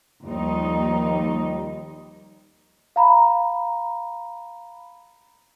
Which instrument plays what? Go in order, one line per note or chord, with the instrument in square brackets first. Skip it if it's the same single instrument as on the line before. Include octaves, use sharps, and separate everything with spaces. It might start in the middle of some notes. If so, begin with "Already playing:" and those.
[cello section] D#2 F3 G3 D#4
[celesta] F5 A#5 B5